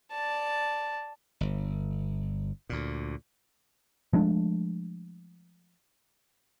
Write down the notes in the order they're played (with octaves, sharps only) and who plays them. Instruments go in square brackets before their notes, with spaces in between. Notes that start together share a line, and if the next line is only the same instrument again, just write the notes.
[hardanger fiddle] D5 A5
[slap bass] G1
D2 A#2
[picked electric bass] F3 G#3 A3 D4